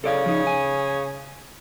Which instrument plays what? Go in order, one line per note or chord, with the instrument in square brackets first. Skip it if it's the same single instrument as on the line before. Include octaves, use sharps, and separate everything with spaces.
[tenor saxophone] C#3 [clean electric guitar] A4 D5 F5
[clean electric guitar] F3 D#4
G#5